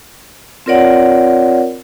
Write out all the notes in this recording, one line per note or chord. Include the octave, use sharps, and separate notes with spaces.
C4 F4 A#4 C#5 D5 F#5